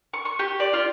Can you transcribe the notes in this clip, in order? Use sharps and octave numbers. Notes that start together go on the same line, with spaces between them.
C#6
C#6
G4
D5
F4